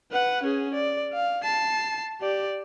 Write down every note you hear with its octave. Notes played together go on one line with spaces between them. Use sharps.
B4 F#5
C#4 G#4
D5
F5
A5 C7
G4 D5